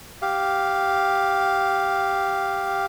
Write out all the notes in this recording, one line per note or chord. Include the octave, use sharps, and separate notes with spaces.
G4 F5